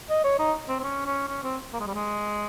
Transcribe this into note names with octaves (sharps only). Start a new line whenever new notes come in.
D#5
C#5
D#4
C4
C4
C#4
C#4
C#4
C4
A#3
G#3
G3
G#3